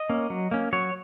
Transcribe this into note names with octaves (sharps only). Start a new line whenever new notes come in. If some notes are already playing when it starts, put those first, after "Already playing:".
Already playing: D#5
A#3 C#4
F#3
A#3 C#4
F#3 C#5